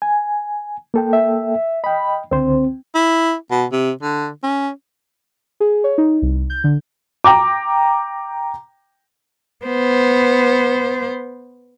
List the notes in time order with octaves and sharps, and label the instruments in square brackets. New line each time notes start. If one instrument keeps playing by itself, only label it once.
[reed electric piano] G#5
A#3 A4 G5
[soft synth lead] E5
[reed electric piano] D#5 G5 [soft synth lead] B5
[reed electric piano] C#2 D3 C5 [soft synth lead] C4
[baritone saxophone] E4
B2
C3
D3
C#4
[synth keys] G#4
C#5
D#4
C2
G6
D3
[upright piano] G5 A#5 D6
[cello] B3 C5